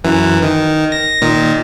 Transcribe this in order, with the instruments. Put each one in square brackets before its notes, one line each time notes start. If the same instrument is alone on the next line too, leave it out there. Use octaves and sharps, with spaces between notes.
[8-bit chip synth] F#2 E3
D#3
A#6
A#2 D#3